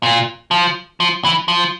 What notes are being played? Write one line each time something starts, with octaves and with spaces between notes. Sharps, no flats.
A#2
F3
F3
E3
F3